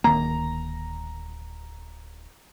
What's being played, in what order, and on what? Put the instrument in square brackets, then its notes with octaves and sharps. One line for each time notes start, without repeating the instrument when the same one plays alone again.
[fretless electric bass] D1 D#3 A#3 [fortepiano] A#5